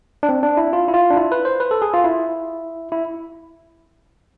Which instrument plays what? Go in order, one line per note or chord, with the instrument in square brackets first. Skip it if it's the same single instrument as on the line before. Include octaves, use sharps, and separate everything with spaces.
[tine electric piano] D4
C4
D4
E4
F4
E4
F4
D4
E4
B4
C5
B4
A4
G#4
F4
E4
E4